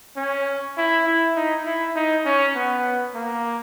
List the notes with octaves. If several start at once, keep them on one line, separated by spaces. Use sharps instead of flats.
C#4
E4
E4
D#4
E4
D#4
C#4
B3
A#3